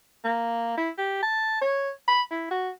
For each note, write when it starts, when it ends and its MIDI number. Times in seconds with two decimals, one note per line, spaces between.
0.25 0.77 58
0.78 0.90 64
0.98 1.21 67
1.23 1.62 81
1.62 1.90 73
2.08 2.22 83
2.31 2.47 64
2.51 2.70 66